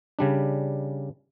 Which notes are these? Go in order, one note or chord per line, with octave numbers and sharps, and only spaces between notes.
C#3 G3 D4